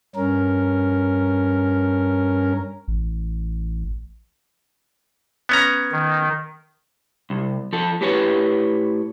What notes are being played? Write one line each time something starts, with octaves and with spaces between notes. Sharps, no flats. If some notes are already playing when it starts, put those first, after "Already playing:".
G2 C#4 A#4
A1
B3 C#4 A#5
D#3
C2
F3 A4
A2 G4 B4 C#5 G#5